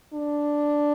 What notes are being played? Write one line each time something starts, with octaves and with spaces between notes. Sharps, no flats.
D4